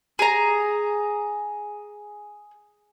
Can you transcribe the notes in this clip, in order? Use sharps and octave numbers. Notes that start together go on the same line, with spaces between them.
G#4 A#5